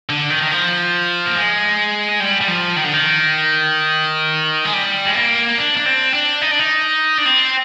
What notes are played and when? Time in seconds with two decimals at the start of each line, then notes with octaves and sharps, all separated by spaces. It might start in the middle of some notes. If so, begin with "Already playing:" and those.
0.10 D3
0.30 D#3
0.43 D#3
0.51 F3
1.26 A#3
1.35 G#3
2.20 G3
2.41 G3
2.48 F3
2.76 D#3
2.84 D3
2.93 D#3
4.65 G#3
4.73 G3
5.06 G#3
5.15 A#3
5.58 D4
5.77 D4
5.86 C4
6.14 D4
6.42 D#4
6.51 D4
6.59 D#4
7.18 D4
7.26 C4